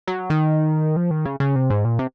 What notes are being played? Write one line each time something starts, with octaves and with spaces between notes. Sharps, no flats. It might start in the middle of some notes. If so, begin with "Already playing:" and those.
F#3
D#3
F3
D#3
C#3
C#3
C3
G#2
A#2
C3